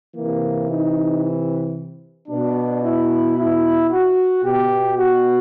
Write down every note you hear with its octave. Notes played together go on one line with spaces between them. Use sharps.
C3 E3 A#3
D#4
B2 D4
E4
E4
F#4
B2 G4
F#4